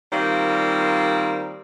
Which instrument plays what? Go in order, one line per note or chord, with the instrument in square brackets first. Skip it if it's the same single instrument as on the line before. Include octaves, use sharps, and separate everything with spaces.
[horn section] D#3 F3 G3 A#3 C4